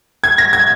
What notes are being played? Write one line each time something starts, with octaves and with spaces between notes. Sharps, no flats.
G#6
A#6
G#6